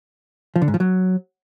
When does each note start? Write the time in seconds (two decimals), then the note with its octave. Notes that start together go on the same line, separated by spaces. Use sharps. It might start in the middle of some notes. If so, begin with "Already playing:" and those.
0.56 F3
0.62 D3
0.68 G#2
0.74 F3
0.80 F#3